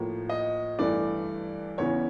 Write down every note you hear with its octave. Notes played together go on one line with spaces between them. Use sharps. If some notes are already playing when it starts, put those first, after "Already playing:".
Already playing: A2 F3 A#3
D#5
G2 E3 A3 D5
E2 C#3 E3 C#5